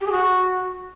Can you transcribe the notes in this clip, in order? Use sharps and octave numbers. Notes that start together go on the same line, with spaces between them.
G4
G#4
F#4